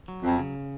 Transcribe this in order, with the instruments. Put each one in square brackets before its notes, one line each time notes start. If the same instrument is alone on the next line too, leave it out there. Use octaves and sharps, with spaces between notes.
[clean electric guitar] F#3
[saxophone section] F2
[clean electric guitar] C#3